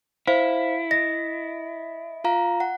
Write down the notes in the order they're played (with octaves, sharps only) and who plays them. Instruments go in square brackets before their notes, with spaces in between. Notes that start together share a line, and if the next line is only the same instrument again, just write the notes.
[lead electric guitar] E4 [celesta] C5 [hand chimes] F5
[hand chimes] D#5 [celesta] A#6
[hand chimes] F4 F5 A#5
F#5